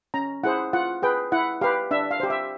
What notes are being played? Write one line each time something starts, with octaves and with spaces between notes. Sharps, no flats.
C#4 A#5
E4 G#4 C5 F#5
F4 F#5
G#4 B4 G5
E4 F#5
G4 B4 F5
D4 E5
F5
G4 C5
E5